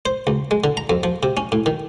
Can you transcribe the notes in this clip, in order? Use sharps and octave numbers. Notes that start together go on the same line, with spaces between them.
C5
C#2
G#3
D3
A#5
F2
F3
C3
C#4
A2
D#3